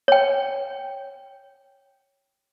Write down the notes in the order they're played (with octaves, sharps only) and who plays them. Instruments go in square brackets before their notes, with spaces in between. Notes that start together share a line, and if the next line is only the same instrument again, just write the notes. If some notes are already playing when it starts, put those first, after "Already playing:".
[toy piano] C#5 G5